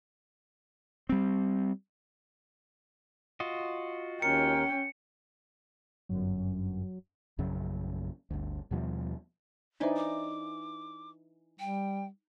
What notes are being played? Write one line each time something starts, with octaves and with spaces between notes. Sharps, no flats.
G3 C4
F4 F#4 D#5
D#2 C#4 A#4 G5 C#7
G1 F#2 F#3
A#1 F#2 C#3 F#3
G1 D2
D#2 B2 F3 G3
E3 D4 D#4 C5 D5 E5
D6
G3 G5